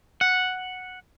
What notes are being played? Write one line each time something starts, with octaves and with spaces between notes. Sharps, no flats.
F#5